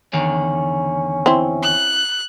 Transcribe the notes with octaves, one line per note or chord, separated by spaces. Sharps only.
E2 D3 D#3 C#4
C4 E4
F#6